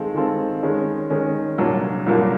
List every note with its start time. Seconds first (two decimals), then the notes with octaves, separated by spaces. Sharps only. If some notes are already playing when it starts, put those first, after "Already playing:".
Already playing: D#3 G#3 C4 F4 A4
0.14 D#3 G#3 C4 F4 A4
0.63 D#3 G#3 C#4
1.10 D#3 G#3 C#4
1.58 C2 A#2 F#3 A#3 D4
2.06 C2 A#2 F#3 A#3 D4